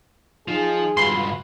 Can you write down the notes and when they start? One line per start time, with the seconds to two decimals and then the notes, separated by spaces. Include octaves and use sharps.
0.48 F3 D#4 G#4
0.97 C#2 G2 F4 F#4 B4 C6